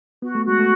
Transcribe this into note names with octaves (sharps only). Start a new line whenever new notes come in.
B3 F#4
A3
G#3 F#4
A3